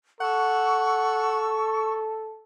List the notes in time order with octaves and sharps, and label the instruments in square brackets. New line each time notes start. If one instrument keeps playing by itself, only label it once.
[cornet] A4 [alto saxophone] F#5 [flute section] C#6 E6